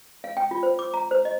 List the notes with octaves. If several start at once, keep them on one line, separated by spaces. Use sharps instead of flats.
F5
G5
F4
C5
D6
A#5
C5
D#5